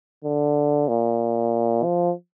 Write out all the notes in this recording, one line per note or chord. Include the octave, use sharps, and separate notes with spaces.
D3
A#2
F3